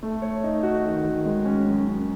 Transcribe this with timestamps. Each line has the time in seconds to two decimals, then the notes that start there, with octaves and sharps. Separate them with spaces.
0.03 A3
0.22 C#5
0.44 D#4
0.63 F#4
0.85 D#3
1.05 D#3
1.26 G#3
1.45 C#4
1.66 F#2
1.87 F#2